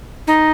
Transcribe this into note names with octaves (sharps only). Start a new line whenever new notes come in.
D#4